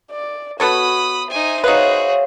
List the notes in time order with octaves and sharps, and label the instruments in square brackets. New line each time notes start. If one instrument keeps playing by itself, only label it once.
[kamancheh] D5
[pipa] B3 A4 C#5 [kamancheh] F#4 [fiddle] B5 D#6
[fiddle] D#4 G#5 [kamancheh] C5 E5
[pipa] D#4 B4 [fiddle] F#4 G#4 [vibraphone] C#5 F5